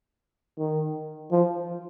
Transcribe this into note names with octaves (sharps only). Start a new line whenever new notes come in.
D#3
F3